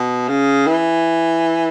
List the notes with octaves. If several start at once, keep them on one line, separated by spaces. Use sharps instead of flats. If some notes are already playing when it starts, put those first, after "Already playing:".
Already playing: B2
C#3
E3